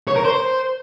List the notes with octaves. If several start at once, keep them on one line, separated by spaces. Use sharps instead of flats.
C#5
A#4
C5